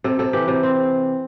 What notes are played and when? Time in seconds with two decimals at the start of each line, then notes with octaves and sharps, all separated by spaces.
0.04 C3 A4
0.19 C3 A4
0.33 E3 G4
0.48 C3
0.63 C4